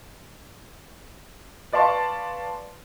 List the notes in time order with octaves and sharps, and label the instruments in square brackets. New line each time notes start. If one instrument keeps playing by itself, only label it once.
[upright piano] B4 D5 F5 A5 C6 C#6